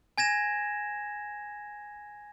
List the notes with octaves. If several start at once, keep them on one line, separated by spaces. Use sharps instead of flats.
G#5 G#6 A#6 E7